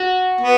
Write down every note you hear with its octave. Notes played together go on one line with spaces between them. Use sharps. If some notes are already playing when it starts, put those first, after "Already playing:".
Already playing: F#4
B3